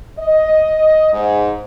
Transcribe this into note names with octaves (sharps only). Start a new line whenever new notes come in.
D#5
G#2